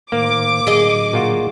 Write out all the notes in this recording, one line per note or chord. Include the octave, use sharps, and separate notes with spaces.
A2 D#3 A#3 C5 D6
A2 D3 F#3 G#4 D#5
A#2 F4 F#4